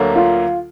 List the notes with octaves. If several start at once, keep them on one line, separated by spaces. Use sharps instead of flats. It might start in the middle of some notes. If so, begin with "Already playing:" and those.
Already playing: D2 D3 F#3 A#3
F4